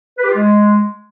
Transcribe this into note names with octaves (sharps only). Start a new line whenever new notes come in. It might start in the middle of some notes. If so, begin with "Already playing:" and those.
B4
G4
F4
G#3